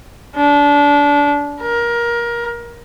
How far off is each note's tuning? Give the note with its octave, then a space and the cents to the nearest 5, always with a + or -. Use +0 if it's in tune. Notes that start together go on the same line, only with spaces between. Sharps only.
D4 -25
A#4 +20